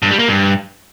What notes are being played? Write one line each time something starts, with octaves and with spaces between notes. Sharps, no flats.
G2
G3
A#3
G2